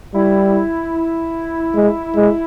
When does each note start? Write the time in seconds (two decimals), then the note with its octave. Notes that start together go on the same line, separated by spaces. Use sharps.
0.15 G3 E4
1.75 G#3
2.16 G#3